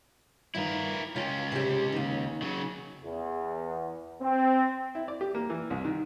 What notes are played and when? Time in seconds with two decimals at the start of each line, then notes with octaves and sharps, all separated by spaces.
0.55 G2 D#3 E4 F4 A#4
1.16 C#2 C#4 F4 G5
1.52 C3 G4
1.92 D#2 D#3
2.42 C#3 F#3
3.03 E2
4.21 C4
4.95 E4
5.08 D5
5.21 G4
5.35 A#3
5.50 E3
5.70 C2
5.85 D#3